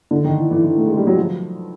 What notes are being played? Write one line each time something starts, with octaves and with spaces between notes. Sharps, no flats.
D3
D#3
E3
E3
E3
A3
G#3
G3
F#3
F3